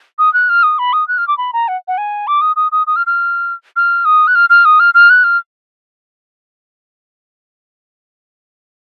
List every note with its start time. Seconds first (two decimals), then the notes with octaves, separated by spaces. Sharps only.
0.19 D#6
0.33 F#6
0.49 F6
0.63 D#6
0.79 B5
0.93 D#6
1.08 F#6
1.18 F6
1.28 D6
1.38 B5
1.53 A#5
1.68 F#5
1.88 F#5
1.98 G#5
2.27 D6
2.41 D#6
2.56 D#6
2.72 D#6
2.87 D#6
2.96 F6
3.07 F6
3.76 F6
4.05 D#6
4.27 F#6
4.35 F6
4.50 F6
4.65 D#6
4.80 F6
4.94 F6
5.10 F#6
5.24 F6